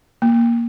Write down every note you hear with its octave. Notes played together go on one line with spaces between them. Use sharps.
A#3